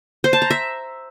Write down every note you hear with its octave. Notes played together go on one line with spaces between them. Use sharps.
C5
A5
A#5
E5